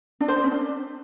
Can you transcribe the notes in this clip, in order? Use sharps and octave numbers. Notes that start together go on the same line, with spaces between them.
D4
C5
D4
C#4
D4